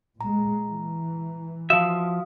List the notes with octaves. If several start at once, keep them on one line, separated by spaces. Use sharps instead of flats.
A#2 G#3 A#5
E3
F3 F#4 E5 F5 D#6